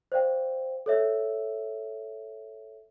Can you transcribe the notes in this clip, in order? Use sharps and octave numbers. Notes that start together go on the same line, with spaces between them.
C5 D5 F5 G5
A4 C#5 E5